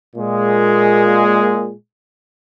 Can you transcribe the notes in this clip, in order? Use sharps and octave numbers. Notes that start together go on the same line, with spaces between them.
A#2 G#3